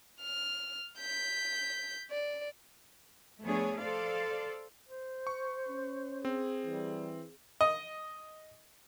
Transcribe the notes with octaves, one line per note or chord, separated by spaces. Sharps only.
F6
G6 B6
D5
F3 A3 B3 D4 G#4 C#5
A4 C5 D5 F5
C5
C#6
C#4
C4 G#4
E3 G3
D#5